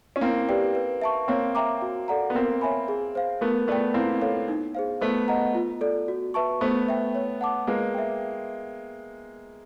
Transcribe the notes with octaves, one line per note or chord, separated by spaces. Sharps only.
C#4
A#3 C4 E4
G4 B4 D5 G5
B4
E5 A5 C#6
A#3 C4 C#5
E5 G5 A#5 D6
F#4
A4 D5 F#5 A#5
B3
A#3 C4 A#4
C#5 E5 G#5 B5
G#4
C5 F5
A3 B3 A#4
A3 B3 D5 G5
A#3 C4 E4
A4 C#5 F5
D#4
G#4 C5 F5
A3 B3 C5
D#5 F#5 A#5
F4
A4 D5
F#4
B4 E5 A5 C#6
A3 B3 C5
E5 G5
C#5
F#5 A5 D6
G#3 A#3 B4
E5 G5